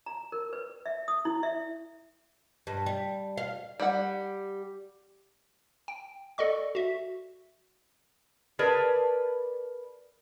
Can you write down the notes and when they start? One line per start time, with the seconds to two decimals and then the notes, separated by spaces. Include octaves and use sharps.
0.06 A#5
0.32 A#4
0.53 B4
0.86 E5
1.08 D#6
1.25 E4
1.43 E5
2.67 G2
2.86 G3
3.38 F5
3.80 G3 F#5
5.88 G5
6.38 A4 D5 D#5 C#6
6.75 F#4 E5
8.59 G#4 A#4 B4 D5 A5